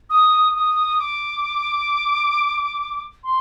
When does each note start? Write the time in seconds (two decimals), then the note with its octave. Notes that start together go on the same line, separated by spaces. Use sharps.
0.10 D#6
0.55 D#6
0.99 D6
3.24 C6